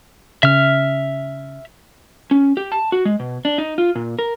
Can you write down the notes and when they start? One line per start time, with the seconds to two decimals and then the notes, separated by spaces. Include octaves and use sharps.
0.43 C#3 E5 F6
2.31 C#4
2.57 G4
2.72 A5
2.92 F#4
3.05 G#3
3.20 B2
3.45 D4
3.58 D#4
3.78 F4
3.95 A#2
4.19 A#4